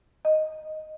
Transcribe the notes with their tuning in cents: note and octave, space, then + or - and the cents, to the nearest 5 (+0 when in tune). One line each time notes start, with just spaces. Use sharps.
D#5 -5